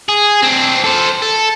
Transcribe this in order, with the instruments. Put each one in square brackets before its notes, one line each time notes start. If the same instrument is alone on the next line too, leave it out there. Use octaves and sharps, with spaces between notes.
[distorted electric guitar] G#4
C4 D4
A4 C5
A4